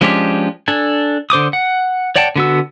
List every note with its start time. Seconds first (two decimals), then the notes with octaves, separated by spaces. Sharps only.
0.01 F3 G#3 C#4 D4 G4
0.68 D4 A4 G#5
1.30 D3 C5 D6 D#6
1.53 F#5
2.16 C#5 D5 F#5 G5 A5
2.36 D3 B3 F#4 E6